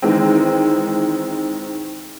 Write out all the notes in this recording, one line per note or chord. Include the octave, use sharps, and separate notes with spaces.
D#3 E3 G#3 C4